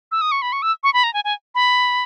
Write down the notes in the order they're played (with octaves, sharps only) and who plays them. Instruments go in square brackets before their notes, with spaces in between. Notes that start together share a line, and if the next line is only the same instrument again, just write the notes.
[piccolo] E6
D#6
C#6
B5
C#6
E6
C#6
B5
A#5
G#5
G#5
B5